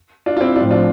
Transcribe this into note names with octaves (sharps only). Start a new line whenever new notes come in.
D4 F4
F4
C4 E4
A2 F3 C4 D4 F4
D4 F4